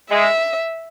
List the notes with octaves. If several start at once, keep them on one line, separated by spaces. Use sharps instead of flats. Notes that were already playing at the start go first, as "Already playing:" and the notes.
G#3 E5